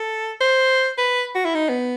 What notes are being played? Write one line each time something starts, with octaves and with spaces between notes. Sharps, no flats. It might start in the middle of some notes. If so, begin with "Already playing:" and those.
Already playing: A4
C5
B4
F#4
E4
D#4
B3